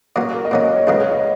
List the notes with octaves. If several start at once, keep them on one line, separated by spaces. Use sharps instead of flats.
A#2 F#3 C#4 F#4
A#4
D#5
A#2 F#3 C#4 C#5
D#5
C#5
C#2 C#3 F#3 B4
C#5
D#5